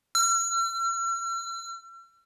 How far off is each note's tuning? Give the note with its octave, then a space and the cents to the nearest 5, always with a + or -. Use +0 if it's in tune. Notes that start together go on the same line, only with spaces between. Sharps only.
E6 +45